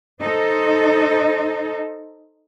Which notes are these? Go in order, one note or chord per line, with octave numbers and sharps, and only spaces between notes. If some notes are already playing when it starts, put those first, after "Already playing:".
D#4 A4 C5 D#5